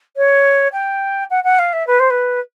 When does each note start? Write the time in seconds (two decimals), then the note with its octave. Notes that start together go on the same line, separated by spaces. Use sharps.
0.16 C#5
0.72 G5
1.30 F#5
1.43 F#5
1.58 F5
1.73 E5
1.87 B4
1.99 C5
2.10 B4